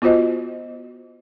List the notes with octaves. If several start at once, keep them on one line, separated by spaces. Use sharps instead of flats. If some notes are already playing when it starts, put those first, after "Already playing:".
B3 F4 F#4 C5 D#5